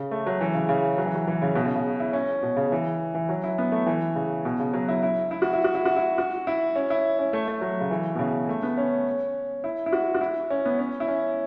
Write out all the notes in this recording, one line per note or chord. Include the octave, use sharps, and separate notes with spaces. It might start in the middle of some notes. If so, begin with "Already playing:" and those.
Already playing: C#3
A3
F#3
E3
C#3
C#3
F#3
E3
F#3
E3
C#3
B2
C#3
C#3
E4
C#4
B2
C#3
E3
E3
F#3
E4
B3
A3
E3
C#3
B2
C#3
F#3
E4
E4
E4
F#4
E4
F#4
E4
F#4
E4
F#4
E4
C#4
E4
C#4
A3
A3
F#3
C#3
E3
B2
C#3
A3
B3
C#4
E4
E4
F#4
F#4
E4
C#4
B3
C#4
E4
C#4